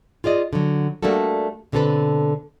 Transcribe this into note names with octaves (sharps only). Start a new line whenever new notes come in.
F4 G#4 D5 D#5
D3 F#3
G3 A3 A#3 D4 F#4 A4
B2 D3 C4 G#4 A4 B4